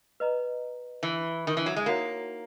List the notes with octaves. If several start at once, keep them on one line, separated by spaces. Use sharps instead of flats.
B4 D#5 A#5
E3
D#3
E3
F#3
G#3
A#3 D#4 F#4 C#5 F#5 A#5